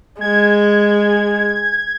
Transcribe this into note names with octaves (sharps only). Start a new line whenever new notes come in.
G#3 G#6